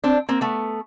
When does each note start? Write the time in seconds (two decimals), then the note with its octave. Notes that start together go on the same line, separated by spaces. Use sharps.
0.04 C4 D4
0.29 A#3 C4
0.41 A3 B3